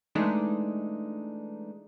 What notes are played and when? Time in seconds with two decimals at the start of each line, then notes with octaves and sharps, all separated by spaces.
0.15 E3 G#3 A3 D4 D#4